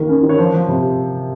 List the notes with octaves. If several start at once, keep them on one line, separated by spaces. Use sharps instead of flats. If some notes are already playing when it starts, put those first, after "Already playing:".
Already playing: D#3 A#3
C#4
D#3
C#5
F3 C5
F3
C3